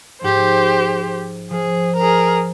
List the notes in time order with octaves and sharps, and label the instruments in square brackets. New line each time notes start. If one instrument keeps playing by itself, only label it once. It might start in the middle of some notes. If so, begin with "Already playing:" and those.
[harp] G#2 F3 G#3 [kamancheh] G4 C5
[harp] F3 [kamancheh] G#4
[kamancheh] G#4 A#4